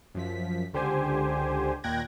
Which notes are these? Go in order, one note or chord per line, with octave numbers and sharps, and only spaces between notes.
F#2 F3 B6
C#2 D3 G4 C5 G#5
D#2 A#2 G5 F#6 G#6 A#6